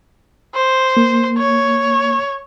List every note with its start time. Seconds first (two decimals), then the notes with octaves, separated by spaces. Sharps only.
0.55 C5
0.97 A#3
1.38 C#5